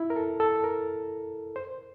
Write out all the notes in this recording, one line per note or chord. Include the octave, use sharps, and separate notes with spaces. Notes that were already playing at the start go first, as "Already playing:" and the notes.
Already playing: E4
A#4
A4
A4
A#4
C5